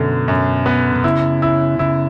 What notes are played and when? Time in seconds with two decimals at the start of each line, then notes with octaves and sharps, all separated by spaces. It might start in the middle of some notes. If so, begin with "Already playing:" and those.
Already playing: F#2 B2 D3
0.28 F#2
0.66 B3
0.96 B2
1.04 C#3 E4
1.42 E4
1.79 C#3 E4